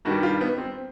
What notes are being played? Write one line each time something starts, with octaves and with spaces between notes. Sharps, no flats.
G2 D#3 G3 F#4
F4
B3
C4